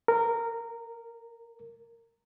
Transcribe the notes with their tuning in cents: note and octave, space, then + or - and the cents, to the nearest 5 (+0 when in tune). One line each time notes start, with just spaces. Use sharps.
A#4 -15